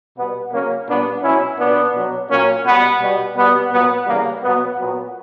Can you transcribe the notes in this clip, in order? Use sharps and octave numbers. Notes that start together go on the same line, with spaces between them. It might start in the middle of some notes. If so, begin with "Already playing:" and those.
B2 G3 B3
C#3 F#3 A#3 C#4
A#2 G3 B3 D4
B2 F#3 C#4 E4
A#2 F#3 B3 D4
B2 F#3
A#2 F#3 A#3 C#4
B2 G3 B3
B2 G3
B2 G3 B3
A#2 F#3 B3
C#3 E3 G3 A#3
B2 F#3 B3
A#2 F#3 B3